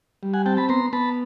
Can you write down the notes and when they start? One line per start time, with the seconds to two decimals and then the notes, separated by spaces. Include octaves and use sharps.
0.23 G3
0.33 F#5 G#5
0.46 C4 G5 A5
0.57 A5 B5
0.69 B3 A#5 C6
0.93 B3 A5 B5